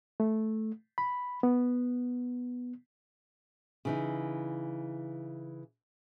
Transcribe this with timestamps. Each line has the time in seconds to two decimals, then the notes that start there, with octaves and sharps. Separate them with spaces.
0.20 A3
0.98 B5
1.43 B3
3.85 C#3 E3 D#4